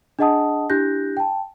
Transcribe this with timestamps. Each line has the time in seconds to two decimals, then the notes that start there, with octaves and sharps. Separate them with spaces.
0.19 D4 G#4 D#5 F#5 A5 D#6
0.70 D4 E4 G4 F#6 G6 A#6
1.17 G5 A5